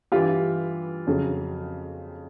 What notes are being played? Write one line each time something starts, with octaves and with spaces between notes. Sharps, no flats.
G2 E3 G3 F4 G4
F2 C#3 F#3